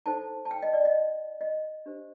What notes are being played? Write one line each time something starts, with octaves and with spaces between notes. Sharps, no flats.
D#4 A4 C5 A5
A5
G5
D#5
D5
D#5
D#5
D4 G4 C5